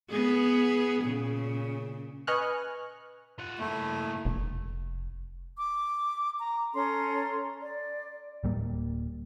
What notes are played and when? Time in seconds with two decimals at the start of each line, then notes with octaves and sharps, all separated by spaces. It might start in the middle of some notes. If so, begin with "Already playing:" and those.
0.10 B3 G#4
1.03 A#2 C#3
2.27 B4 D#5 G#5 C#6 F6 F#6
3.39 F4 F#5
3.59 A3 A#3 E4
4.25 F1
5.57 D6
6.39 A#5
6.74 C#4 A4 A#5 C6
7.61 D5
8.44 D1 G3 A#3